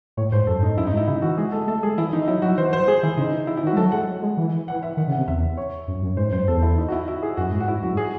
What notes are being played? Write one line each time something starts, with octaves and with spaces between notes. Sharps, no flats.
A2 C#5
G#2 C5
F#2 A4
G#2 D#4
F#2 E4
D#4
G#2
E4
C#3 E4
E3 F#4
G#3 G#4
G#3 A4
A3 A4
G#3 G#4
E3 E4
D#3 D#4
F#3 E4
F#3 F#4
E3 C5
F#3 C5
G#3 G#4
D#3 E4
C#3 D#4
E3
C#3 E4
E4
D#3
F#4
G#3
F#3 A4
G#3 F#5
F#3
G#3
E3
E3 F#5
E5
D#3 F#5
C#3
F#5
C3
E2 E5
C#5
F#2
F#2
G#2 C5
F#2 C5
E2 A4
E4
D#4
F#4
E4
E4
G#4
F#2 F#4
G#2
F#4
G#2 E4
F#2 F#4
G#2
G#4